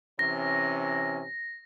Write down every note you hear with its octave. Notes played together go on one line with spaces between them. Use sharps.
C3 E3 C#4 A#6